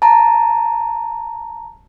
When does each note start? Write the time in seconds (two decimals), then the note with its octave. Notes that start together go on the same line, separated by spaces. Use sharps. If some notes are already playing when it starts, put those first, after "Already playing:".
0.02 A5 A#5